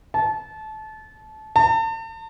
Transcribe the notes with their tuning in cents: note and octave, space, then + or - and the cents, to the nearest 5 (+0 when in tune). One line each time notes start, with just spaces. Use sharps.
A5 -25
A5 +40